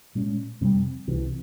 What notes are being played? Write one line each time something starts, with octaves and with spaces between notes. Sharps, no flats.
A#2 G#3 C#4
F2 C3 G3 C4
C2 C3 E3